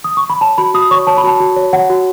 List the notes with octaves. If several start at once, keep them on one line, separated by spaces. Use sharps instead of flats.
D#6
C#6
B5
C#5 A5
F#4 B5
F#4 D#6
C#5 C#6
C#5 A5
B5
F#4 A5
F#4
C#5
C#5 F#5
F#4